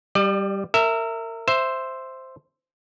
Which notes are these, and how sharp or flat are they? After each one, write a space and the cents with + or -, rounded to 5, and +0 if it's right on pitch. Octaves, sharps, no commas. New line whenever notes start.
G3 +0 D5 +40
A#4 -30 E5 +0
C5 +0 E5 +5